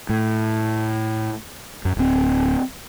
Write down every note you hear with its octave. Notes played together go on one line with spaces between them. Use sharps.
A2
F#2
D1 C4